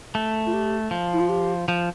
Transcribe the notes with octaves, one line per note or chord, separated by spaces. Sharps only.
A3
F4
G4
F3
E4
F4
G4
F3